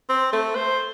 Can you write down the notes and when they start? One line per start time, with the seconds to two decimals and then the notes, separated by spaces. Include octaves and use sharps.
0.09 C4
0.33 A3
0.56 C5